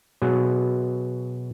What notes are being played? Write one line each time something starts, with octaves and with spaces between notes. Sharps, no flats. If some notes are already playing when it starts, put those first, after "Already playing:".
B2 F#3 G#4